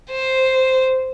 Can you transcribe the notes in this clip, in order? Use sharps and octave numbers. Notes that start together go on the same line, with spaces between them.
C5